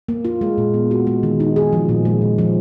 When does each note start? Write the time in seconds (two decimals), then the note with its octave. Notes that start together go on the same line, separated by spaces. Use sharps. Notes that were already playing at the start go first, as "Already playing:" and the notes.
0.09 A#3
0.25 F4
0.41 G#3
0.58 A#2
0.74 B3
0.91 F#4
1.07 G#3
1.23 D#3
1.40 D#4
1.56 G#4
1.73 F3
1.89 A#2
2.05 G#3
2.22 A#2
2.38 F3